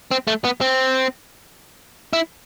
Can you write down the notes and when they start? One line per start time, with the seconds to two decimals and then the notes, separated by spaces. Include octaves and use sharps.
0.11 C4
0.27 A3
0.44 B3
0.61 C4
2.13 E4